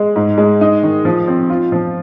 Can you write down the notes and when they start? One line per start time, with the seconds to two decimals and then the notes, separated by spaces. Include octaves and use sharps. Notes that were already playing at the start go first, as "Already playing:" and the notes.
Already playing: G#3
0.16 G#2
0.38 G#3
0.61 D#4
0.83 D#3
1.05 F3
1.28 C4
1.50 F4
1.72 F3